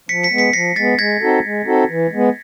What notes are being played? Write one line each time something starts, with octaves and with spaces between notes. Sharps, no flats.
F3 B6 C#7
B6 C#7
G#3 B3
B6 C#7
F3 A#6 C7
G#3 B3 A6 B6
G#3 G#6 A#6
C4 D#4 F#4 A4
G#3
C4 D#4 F#4 A4
E3
G#3 B3